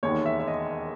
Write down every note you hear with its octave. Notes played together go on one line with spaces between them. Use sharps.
E1 D#2 D#3 C#5
E5
E5
D#5